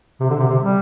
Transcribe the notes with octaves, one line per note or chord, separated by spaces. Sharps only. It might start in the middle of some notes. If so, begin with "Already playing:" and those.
C3
D3
C3
C3
G3